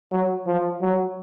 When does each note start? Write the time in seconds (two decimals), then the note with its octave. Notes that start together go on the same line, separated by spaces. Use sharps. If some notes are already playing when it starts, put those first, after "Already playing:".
0.12 F#3
0.47 F3
0.82 F#3